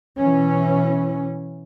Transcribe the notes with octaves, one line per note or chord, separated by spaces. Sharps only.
B2 E3 C#4